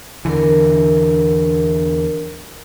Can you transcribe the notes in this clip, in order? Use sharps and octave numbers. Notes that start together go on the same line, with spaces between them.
E2 D3 E3 D4 A#4